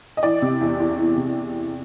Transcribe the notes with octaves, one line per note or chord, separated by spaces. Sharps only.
D#5
E3 D5
C3
E2
E2
E3
C3